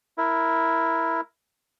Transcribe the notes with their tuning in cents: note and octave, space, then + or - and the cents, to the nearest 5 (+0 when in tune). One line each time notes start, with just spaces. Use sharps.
E4 +0 A#4 +0